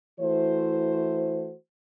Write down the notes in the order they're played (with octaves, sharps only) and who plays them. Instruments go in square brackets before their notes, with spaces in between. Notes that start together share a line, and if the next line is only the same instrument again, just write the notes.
[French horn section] E3 A3 E4 F#4 C5